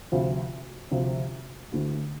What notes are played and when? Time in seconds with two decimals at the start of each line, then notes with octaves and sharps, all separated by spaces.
0.12 D2 C3 F3
0.91 D2 C3 F3
1.72 D2 D3 A3 E4